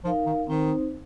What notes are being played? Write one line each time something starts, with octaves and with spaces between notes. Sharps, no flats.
F3 D#4 A#4 F5
D#3
D#3 C4 D#4 C5